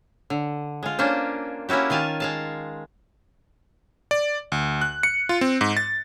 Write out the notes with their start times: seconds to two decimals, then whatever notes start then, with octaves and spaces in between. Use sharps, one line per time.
0.30 D3
0.83 G#3 F4
0.99 A#3 C#4 D4 C5
1.69 A#3 C#4 E4 F#4 G4
1.90 D#3 F4 G#5 A5
2.20 G#3 F5 A5
4.11 D5
4.52 D2
4.81 F#6
5.03 C#7
5.29 F4
5.41 C4
5.61 G#2
5.77 A6